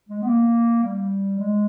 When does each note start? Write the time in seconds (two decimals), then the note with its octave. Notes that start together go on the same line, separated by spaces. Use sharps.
0.09 G#3
0.22 B3
0.27 A#3
0.84 G3
1.39 G#3